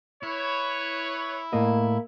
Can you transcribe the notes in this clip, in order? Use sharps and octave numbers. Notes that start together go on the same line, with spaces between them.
E4 B4 C#5
A2 A#3 D#5